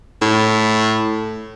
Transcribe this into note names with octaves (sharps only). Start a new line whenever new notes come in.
A2